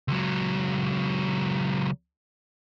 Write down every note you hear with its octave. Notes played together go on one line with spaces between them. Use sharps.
C#2 F#3